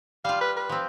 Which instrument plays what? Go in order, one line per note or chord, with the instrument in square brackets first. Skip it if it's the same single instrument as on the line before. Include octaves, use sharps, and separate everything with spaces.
[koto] G3 F4 [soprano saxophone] F5
[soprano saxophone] B4
B4
[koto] F3 C4